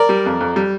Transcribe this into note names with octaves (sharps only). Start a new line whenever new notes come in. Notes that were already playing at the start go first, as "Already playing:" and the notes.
Already playing: A#4 D5
G3
F2
F2
G3